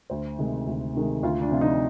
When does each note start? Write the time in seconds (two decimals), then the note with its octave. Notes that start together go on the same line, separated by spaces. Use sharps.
0.10 D2 C5
0.39 C3 D#3 G#3
0.67 D2
0.94 C3 D#3 G#3
1.23 D2 F4
1.41 D4
1.51 C3 F3 C4 F4
1.61 D#4